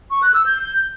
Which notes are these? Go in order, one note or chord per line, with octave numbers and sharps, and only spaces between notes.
C#6
F#6
E6
G6